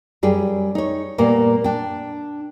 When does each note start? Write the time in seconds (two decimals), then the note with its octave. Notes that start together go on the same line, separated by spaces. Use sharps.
0.23 F#2 G3 G#4 G5
0.75 D#4 C#5
1.18 A#2 G3 A#3 B3
1.64 D4 G5